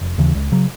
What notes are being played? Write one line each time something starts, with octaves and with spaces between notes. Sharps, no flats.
F1
D#2 C#3 E3
C#2
C#3 F#3